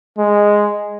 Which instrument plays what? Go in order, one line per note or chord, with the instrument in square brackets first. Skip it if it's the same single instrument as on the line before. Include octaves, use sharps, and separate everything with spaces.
[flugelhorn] G#3